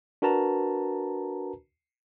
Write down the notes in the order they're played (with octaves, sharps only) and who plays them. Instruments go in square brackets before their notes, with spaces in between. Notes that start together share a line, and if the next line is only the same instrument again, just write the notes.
[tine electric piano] D4 F#4 A#4 B4 A5 A#5